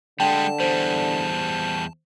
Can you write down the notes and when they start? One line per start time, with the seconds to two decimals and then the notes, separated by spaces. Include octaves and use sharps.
0.20 D3 G3 G#3 G5 A5
0.60 E2 G3 C5